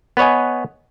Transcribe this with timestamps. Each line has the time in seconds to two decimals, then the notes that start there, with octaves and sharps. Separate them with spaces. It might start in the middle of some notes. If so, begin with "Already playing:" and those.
0.17 B3 B4 C#5 D#5 G#5